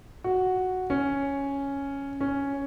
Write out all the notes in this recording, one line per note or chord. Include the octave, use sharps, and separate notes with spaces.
F#4
C#4
C#4